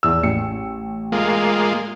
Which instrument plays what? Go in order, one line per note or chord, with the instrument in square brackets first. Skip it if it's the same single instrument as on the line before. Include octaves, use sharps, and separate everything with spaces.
[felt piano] E2 E6
A1 C#7
[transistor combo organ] G#3 A#3 F4